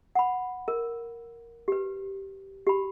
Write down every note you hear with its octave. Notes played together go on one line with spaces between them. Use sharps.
F#5 B5
A#4
G4 B4
G4 B5